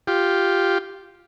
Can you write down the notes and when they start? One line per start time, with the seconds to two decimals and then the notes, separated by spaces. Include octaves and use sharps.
0.07 F4 G4